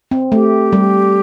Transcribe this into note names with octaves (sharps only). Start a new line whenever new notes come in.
C4
A3 G4
G3